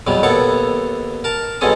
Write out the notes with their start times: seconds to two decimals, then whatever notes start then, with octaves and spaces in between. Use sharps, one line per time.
0.07 E2 B2 F#3 G3
0.23 D#2 B3 A4 C#5 D6
1.24 A#4 A5
1.61 G2 B2 G#3 C#4 A4 D#6